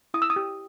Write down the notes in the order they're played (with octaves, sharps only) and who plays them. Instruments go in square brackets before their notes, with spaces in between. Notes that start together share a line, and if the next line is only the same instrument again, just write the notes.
[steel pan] E4 D#6
E6
D#6
G4